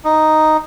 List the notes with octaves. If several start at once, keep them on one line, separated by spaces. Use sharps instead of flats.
D#4